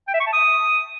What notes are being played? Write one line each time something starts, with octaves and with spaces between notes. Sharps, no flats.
G5
E5
C#6
A5
D#6